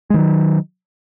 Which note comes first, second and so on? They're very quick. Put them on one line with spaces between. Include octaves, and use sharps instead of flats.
G#3 D#3 F#3